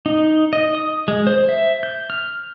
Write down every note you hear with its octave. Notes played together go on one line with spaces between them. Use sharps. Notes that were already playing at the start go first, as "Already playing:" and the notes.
D#4
D#5
D#6
G#3
C5
E5
G6
F6